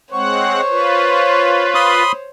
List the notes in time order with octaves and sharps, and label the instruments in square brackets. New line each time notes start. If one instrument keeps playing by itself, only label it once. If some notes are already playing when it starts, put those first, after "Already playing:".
[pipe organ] G#3 C4 F#5 [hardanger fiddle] C5 C#5 [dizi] C#6
[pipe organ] F4 B4
[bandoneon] B5 C6 D#6